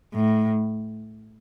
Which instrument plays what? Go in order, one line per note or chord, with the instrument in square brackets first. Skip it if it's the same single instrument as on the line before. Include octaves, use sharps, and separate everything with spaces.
[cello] A2